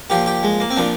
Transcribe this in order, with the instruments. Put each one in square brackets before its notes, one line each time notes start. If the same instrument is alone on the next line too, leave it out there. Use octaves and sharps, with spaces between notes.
[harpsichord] A#2 F3 G4
G4
G#3
A#3
C4
A#2 F3 D4